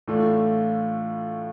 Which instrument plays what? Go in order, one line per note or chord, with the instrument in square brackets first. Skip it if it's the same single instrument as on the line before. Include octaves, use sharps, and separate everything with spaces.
[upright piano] A2 E3 A3 D4 F4